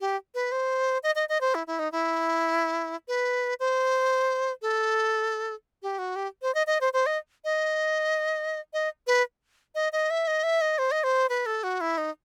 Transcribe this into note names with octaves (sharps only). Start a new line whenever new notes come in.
G4
B4
C5
D#5
D#5
D#5
C5
E4
E4
D#4
E4
B4
C5
A4
G4
F#4
G4
C5
D#5
D#5
C5
C5
D#5
D#5
D#5
B4
D#5
D#5
E5
D#5
E5
D#5
C5
D#5
C5
B4
A4
F#4
E4
D#4